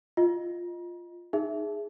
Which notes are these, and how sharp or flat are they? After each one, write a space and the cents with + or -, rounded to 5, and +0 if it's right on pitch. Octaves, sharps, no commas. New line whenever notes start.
F4 +0 D#5 +0
D#4 -10 G#4 +0 E5 +0